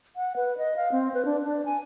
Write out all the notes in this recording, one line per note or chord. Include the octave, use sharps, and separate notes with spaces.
F#5
B4
D#5
F5
C4
B4
D4
D4
G#5